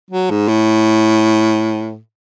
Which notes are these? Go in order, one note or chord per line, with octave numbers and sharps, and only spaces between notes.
F#3
G#2
A2